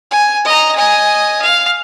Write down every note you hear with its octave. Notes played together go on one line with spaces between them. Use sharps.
G#5
D#5 A#5
D#5 G#5
F5